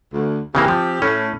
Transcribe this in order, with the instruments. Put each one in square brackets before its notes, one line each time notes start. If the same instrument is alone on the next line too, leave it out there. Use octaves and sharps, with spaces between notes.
[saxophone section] D2
[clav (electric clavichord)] C#3 E3 A#3 [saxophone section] C4 G4
[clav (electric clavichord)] F3
[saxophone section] A2 [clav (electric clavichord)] C#4